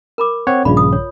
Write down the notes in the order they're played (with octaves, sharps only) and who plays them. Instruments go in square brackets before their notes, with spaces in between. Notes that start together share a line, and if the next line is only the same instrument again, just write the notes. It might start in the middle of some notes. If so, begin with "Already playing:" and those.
[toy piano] A#4 B5 D6
[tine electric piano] C4 C#5 F#5
[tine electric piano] A#1 G2 C#3 [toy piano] F4 D5 B5
[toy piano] D#6
C#5